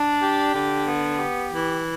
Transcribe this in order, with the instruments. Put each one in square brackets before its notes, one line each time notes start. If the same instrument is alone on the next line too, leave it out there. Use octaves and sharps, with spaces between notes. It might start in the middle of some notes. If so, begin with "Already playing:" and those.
Already playing: [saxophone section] D4
G4
D3
B3
G4
E3